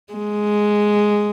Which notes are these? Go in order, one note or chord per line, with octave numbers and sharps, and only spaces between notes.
G#3